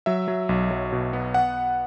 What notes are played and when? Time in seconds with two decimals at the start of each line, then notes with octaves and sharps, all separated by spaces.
0.06 F#3 E5
0.28 F#3
0.49 B1
0.71 F#3
0.92 B2
1.13 B3
1.34 F#5